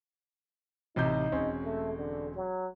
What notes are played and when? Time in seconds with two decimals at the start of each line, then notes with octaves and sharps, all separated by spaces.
0.96 A1 C3 D#4 G6
1.32 E1 C4 C#4
1.64 A3
1.97 D3
2.35 F#3